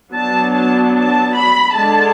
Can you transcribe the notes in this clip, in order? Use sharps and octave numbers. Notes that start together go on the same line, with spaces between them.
F#3 B3 D4 A5
A5
A5
B5
D3 G#3 D4 A5